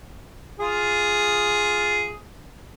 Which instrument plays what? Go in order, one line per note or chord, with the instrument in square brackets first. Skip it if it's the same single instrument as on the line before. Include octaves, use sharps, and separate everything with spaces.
[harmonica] F4 G#4